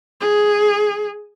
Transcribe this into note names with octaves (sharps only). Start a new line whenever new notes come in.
G#4